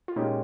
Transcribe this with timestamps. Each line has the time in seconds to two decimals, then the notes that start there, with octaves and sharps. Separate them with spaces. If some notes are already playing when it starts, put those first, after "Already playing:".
0.08 F4
0.16 A#2 G#3 C#4 D#4 G4